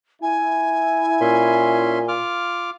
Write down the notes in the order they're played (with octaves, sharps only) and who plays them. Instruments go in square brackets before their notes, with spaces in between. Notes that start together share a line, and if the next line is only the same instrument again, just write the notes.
[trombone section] E4 [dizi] G#5
[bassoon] A#2 [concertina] C#4 E5 C6
[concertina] F4 D6 F6